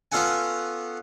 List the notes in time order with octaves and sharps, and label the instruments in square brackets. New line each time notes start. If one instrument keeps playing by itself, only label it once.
[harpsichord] B3 C#4 F4 A4 F#5 G#5